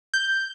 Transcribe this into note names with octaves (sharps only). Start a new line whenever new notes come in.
G6